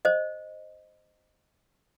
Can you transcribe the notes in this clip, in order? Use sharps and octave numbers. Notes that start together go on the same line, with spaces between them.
C5 D#5